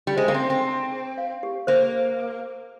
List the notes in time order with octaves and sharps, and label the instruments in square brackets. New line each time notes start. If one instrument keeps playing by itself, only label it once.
[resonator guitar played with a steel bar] G3
[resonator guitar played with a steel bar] G#3 [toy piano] C5
[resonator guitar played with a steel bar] A#3
C4
[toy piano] D#4
[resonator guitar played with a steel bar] C4
[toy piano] A#5
G#4
F5
G4
[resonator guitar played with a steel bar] A#3 [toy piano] C5